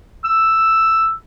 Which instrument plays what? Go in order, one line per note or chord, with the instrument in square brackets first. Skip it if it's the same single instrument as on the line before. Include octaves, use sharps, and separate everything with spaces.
[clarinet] E6